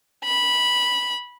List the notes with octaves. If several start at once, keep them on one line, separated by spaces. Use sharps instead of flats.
B5